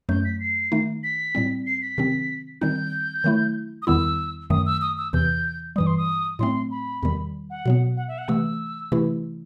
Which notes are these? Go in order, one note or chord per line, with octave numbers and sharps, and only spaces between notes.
F#2 F#3 A3 G6
B6
C7
D#3 A3 D#4
B6
A2 G3 C4
C7
B6
C3 D#3 F#3 C4
D#3 G3 C4 D#4 G6
D#3 F#3 A3 E4
D#6
E2 D#3 G3 B3 E4 E6
F#2 D#3 F#3 A3 D#6
E6
D#6
E6
E2 C3 E3 G6
G2 E3 G3 D#6
C6
D#6
A2 F#3 A3 C4 C6
B5
E2 C3 D#3 G3
F#5
B2 F#3 B3
F#5
E5
F#5
C3 E3 A3 E6
C3 E3 A3 E4